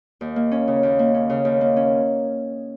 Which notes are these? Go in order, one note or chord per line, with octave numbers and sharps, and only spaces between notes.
D#2
A#3
C#4
C#3
D#2
A#3
C#4
C#3
D#2
A#3
C#4